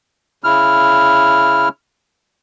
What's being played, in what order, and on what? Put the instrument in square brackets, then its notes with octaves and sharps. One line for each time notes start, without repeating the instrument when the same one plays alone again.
[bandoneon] C#3 E4 F6